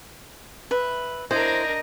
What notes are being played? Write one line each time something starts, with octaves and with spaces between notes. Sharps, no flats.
B4 E5
D4 E4 A#4 C5 D#5